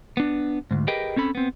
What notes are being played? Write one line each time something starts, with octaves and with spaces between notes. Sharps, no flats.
B3 D4
D2 G#2
G4 G#4 A#4 B4 D#5 G5
C4 C#4 A4 B5
B3 C4